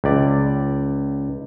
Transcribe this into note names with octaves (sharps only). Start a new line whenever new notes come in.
C#2 D5